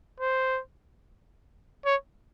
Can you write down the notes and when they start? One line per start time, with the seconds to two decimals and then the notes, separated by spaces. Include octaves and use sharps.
0.20 C5
1.86 C#5